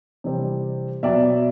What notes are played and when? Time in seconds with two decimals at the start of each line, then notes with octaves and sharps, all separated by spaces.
0.24 C3 E3 G3 C4
1.03 B2 F#3 B3 D5 E5